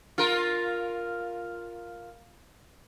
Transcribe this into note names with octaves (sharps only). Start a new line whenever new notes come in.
F4 A#4